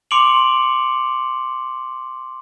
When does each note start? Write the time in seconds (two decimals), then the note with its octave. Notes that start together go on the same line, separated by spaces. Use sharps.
0.11 C6 D6 C#7 D7 F7 F#7